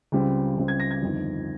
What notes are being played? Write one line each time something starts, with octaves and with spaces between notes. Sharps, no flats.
C#2 C#3 G3 C4
C#2 C#3 G3 C4
G#6
A#6
G#6
G1 F2 D#3